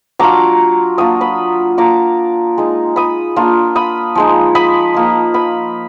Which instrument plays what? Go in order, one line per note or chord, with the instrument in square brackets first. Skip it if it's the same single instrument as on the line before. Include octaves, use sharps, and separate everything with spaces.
[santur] F#3 D4 F4 A#5 D6
F#3 A#3 D4 F4 D#6
B5 D#6
A#3 D4 F4 A#5 D6
G#3 D#4
B5 D#6
A#3 D4 F4
B5 D#6
F3 G#3 D#4
B5 D#6
F3 A#3 D#4
B5 D#6